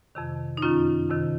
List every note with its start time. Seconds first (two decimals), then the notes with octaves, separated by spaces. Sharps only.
0.15 F2 C3 D#3
0.57 D#4
0.62 F#2 D#3 C#4 F4
1.09 F2 C3 D#3